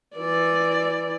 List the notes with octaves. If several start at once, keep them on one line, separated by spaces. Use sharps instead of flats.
E3 D5